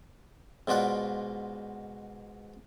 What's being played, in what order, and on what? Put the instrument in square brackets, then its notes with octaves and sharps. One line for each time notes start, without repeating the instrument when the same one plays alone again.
[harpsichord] G#2 B2 F4 D5 F#5